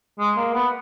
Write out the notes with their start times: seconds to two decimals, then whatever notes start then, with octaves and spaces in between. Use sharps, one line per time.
0.20 G#3
0.37 A#3
0.54 B3